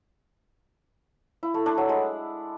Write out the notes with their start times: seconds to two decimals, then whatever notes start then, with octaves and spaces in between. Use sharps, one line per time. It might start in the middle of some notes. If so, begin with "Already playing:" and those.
1.43 E4
1.54 A3
1.66 D4
1.78 F#3
1.89 G#3